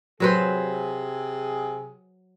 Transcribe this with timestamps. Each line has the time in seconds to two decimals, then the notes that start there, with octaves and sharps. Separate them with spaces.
0.20 C3 F#3 G#4 B4 C5